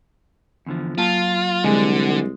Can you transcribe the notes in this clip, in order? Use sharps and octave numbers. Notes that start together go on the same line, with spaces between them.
E2 D3 F3
F#3 A#3 F4 A5
C2 D3 G#3